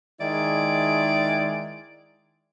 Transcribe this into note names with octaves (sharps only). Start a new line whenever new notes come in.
D#3 G#3 E4 D5